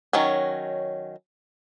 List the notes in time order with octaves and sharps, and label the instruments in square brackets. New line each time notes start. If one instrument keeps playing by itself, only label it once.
[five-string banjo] D#3 F#3 C#4